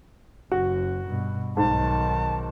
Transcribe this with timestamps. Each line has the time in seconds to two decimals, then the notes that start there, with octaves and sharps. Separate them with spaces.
0.52 F#1 F#4
1.09 G2 B2
1.57 B1 G#2 D#3 A5